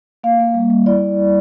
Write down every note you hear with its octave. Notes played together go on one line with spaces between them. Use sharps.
A#3 F5
A#3
G3
G3
E4 D5